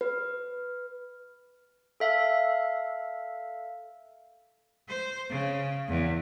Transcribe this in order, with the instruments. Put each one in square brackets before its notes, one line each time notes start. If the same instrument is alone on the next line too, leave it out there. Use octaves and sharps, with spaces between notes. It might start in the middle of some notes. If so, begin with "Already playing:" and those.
[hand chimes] B4
[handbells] A4 E5 F5
[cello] C5
C#3
E2